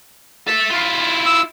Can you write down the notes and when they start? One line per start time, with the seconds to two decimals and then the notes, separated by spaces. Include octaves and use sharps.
0.48 A4 E5
0.70 E4 F4
1.26 E6